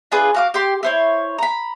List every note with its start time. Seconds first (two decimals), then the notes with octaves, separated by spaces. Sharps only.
0.12 D4 F4 G#4 B4
0.34 F#4 F5 D6
0.54 G4 C6
0.83 E4 C5 C#5
1.38 A#5 B5